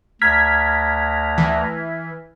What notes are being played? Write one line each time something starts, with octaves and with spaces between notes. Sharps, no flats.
D2 A#5 F6 G#6 B6
E3